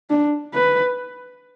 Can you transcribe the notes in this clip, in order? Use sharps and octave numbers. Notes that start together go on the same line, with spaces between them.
D4
B4